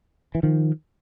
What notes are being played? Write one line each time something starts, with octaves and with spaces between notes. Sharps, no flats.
E3
D#3 F3